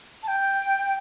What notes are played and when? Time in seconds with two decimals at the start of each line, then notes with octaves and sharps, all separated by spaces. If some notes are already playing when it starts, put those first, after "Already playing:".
0.23 A5
0.28 G5